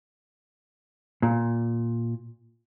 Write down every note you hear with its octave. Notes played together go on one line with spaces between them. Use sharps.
A#2